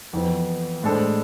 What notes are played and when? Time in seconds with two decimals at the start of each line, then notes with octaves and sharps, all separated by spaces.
0.13 F2 E3 B3
0.83 A2 G#3 D4 A4 C5